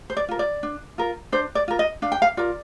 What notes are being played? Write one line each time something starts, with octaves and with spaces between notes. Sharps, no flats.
C5
D5
F4 A#4
D5
D4
F4 A#4
D4 C5
D5
F4 A#4
D#5
D4 F5
G5
F5
F4 A#4 D5